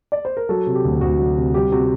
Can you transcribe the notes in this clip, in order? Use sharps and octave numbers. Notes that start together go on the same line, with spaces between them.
D5
C5
A#4
F#3 F#4 A4
C3
G4
D2
D2 F#4
F#3
C3
G3 G4
C3 F#4